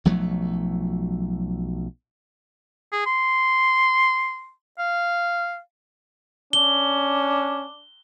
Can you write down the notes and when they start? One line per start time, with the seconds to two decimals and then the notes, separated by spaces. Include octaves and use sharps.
0.05 B1 F3 F#3 A3
2.92 G#4
3.06 C6
4.79 F5
6.53 C#4 D4 G7